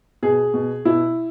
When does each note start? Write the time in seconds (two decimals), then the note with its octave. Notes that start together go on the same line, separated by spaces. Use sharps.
0.23 B2 G#4
0.54 B2
0.85 B2 E4